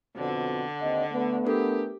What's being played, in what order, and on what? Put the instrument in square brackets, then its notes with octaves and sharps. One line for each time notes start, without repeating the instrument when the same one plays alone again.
[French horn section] F2 B2 C4 [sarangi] D3
[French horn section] D#2 C4 D#5
A3 B3
[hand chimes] D4 A4 A#4 [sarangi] G4